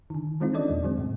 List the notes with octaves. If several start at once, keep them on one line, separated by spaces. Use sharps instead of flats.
D3 D#3
D#3 E3 G#3 C4 D#4 F4
C#4 D4 A4 D5 D#5
E2 A#2
D3 F#3 G#3 C4
A2 C3